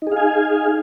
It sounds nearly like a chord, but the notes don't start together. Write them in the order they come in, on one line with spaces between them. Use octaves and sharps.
D#4 G#4 F5 G#5